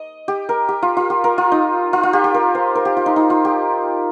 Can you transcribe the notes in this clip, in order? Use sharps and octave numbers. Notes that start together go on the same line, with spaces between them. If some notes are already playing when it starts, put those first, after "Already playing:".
Already playing: D#5
G4
A#4
G4
F4
F4
G4
A#4
F4
D#4
F4
F4
G4
G4
A#4
C5
A#4
G4
F4
D#4
D#4
F4
G4